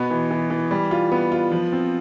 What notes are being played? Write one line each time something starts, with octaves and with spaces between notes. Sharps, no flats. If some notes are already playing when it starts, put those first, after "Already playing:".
Already playing: B2 B3
E3
E3
E3
G3
F4
B3
F4
F3
C4